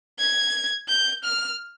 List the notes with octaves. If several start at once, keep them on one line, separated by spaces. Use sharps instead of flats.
G#6
G6
F6